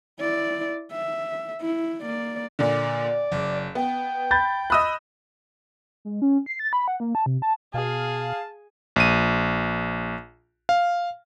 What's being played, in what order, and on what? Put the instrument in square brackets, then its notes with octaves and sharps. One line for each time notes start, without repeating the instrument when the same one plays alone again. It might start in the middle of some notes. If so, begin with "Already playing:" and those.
[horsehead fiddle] E4 D5
E5
E4
A#3 D5
[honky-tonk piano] A#2 D3 [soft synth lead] D5
[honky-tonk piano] F#1
[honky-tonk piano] B3 [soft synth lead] G5
[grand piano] B5 G6 A6
[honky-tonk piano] D#5 E6 F#6 [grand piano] B5 D#6
[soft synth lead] G#3
C#4
C7
A6
B5
F#5
A#3
A5
C3
A5
[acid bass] B2 [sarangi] G#4 [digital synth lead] F5 [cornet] A5
[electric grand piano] A#1 D#7
F5